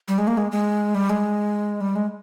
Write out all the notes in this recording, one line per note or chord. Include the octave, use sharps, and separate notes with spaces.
G3
G#3
A#3
G#3
G#3
G3
G#3
G3
G#3